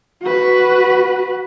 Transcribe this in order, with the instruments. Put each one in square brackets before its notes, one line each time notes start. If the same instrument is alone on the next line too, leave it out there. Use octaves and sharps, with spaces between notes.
[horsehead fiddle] F#4 B4